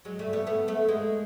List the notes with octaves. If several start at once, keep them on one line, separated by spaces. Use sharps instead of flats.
F#3 G#3
G3 A3
A3 B3
A3 B3
A3 B3
G#3 A#3